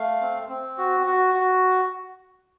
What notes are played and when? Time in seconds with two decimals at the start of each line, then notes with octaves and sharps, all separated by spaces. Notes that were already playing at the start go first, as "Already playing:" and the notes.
Already playing: A3 F5
0.21 C4
0.49 C4
0.78 F#4
1.06 F#4
1.34 F#4